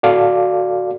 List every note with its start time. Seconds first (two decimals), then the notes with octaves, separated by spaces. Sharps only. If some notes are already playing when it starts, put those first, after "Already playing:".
0.03 F#4 A4 D5 F5